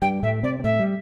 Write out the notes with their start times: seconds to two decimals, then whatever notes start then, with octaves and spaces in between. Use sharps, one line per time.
0.01 G2 G3 G5
0.23 A2 A3 E5
0.43 C3 C4 D5
0.60 C4
0.64 A2 A3 E5
0.79 G3